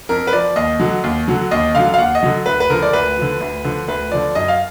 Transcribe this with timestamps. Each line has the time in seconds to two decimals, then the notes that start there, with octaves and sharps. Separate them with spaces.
0.09 F2 A#4
0.27 B4
0.33 F3 D5
0.56 D#2 D#5
0.80 D3 F#3
1.04 D#2
1.28 D3 F#3
1.51 D#2 D#5
1.75 D3 F#3 F5
1.94 F5
1.98 D#2 F#5
2.15 D#5
2.23 D3 F#3
2.46 D2 B4
2.60 B4
2.70 D3 F3 A#4
2.82 D5
2.93 D2 B4
3.17 D3 F3
3.40 D2
3.64 D3 F3
3.88 D2 B4
4.11 D3 F3 D5
4.35 F#2 D#5
4.48 F5